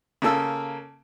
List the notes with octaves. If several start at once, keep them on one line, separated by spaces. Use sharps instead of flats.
C#3 A#3 A4 E6